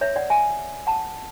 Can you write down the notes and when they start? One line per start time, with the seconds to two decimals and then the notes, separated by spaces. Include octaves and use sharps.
0.01 C#5 E5
0.16 D5 F#5
0.30 E5 G#5
0.87 F#5 A5